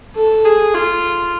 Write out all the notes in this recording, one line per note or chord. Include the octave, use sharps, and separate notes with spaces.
A4
G#4
F4